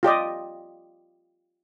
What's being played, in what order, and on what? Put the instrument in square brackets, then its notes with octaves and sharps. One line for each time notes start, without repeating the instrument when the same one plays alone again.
[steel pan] F4 G4 D5 D#5